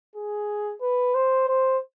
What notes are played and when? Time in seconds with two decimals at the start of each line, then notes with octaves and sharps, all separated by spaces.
0.16 G#4
0.82 B4
1.15 C5
1.48 C5